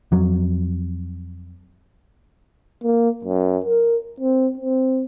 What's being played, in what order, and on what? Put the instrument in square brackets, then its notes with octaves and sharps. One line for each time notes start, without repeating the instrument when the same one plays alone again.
[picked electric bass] F2 F#3
[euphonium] A#3
F#2
A#4
C4
C4